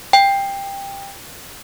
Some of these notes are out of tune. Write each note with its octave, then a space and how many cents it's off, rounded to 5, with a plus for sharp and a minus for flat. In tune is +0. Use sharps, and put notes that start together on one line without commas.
G5 +15